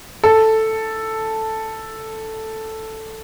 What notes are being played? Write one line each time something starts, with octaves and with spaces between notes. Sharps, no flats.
A4